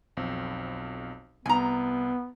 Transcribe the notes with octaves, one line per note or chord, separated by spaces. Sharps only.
B1 F2 C4
C2 B3 G#5 A#5